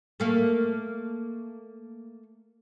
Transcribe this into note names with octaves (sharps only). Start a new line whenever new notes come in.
A3 A#3 A4